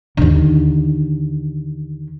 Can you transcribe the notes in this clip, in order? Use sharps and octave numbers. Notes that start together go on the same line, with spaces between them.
D#2 D3